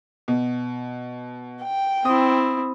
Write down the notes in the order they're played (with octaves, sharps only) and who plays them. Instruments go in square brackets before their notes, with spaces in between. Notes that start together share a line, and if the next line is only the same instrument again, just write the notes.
[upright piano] B2
[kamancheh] G5
[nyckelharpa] C4 E4 [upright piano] D#6